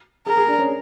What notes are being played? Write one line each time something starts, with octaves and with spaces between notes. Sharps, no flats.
G#4 A#4
G#4
D4
C#4